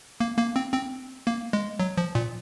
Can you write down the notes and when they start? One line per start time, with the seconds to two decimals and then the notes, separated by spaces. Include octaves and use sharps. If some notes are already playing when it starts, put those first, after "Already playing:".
0.20 A#3
0.38 A#3
0.56 C4
0.73 C4
1.27 A#3
1.53 G#3
1.80 F#3
1.97 F3
2.15 A#2